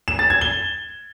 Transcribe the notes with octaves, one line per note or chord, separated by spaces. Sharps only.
E7
A6
G#6
G7